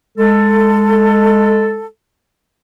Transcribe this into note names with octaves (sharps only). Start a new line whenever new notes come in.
G#3 A4